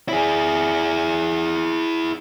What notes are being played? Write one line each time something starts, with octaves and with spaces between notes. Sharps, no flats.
E4 G#4